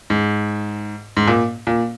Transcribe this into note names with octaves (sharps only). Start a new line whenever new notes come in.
G#2
G#2
A#2
A#2